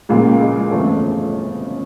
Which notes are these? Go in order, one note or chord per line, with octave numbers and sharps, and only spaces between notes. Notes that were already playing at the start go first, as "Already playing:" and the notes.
C#2 A#2 C#3 F3 A#3
G#3
G1 F2 C#3 E3 A3